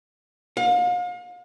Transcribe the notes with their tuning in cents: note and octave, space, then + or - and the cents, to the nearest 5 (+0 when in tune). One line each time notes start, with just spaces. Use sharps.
F5 +40